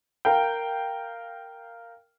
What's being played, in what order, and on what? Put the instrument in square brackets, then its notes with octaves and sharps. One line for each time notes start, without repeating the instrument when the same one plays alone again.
[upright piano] A#4 F5 G5